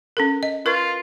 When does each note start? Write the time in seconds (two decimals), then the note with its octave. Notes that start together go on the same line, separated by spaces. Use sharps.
0.17 C#4 A4 A#4
0.43 D#5
0.66 F4 A#4 B4 C#6